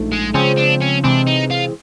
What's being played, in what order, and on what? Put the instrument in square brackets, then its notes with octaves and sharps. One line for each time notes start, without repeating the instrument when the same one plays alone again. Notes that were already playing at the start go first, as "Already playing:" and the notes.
Already playing: [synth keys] A#1 G#2 F3 A3
[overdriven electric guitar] G#3
[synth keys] C#3 F3 G#3 C4 [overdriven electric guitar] C#4
[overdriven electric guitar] D4
C#4
[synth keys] C3 E3 G#3 C4 [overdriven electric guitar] D4
[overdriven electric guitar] D#4
F4